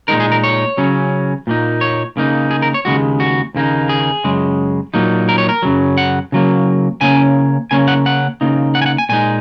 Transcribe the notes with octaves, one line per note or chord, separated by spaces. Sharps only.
A#2 G#3 D#4 A#4
G#4
A#4
C#5
C#3 F#3 C#4
A#2 A#3 D#4
C#5
C#3 A#3 D#4
G#4
A#4
C#5
D#2 C#3 G#3 F#4
F#4
D#2 C#3 A#3 D#4
G#4
F#2 C#3 G#3
A#2 F#3 A#3 D#4
A#4
C#5
A#4
F#2 C#3 F#3
F#5
C#3 F#3 A#3
C#3 A#3 C#4 G#5
C#3 A#3 C#4 G#5
F#5
F#5
C#3 A#3 D#4
F#5
G#5
F#5
G#5
A#2 G#3 D#4 G#5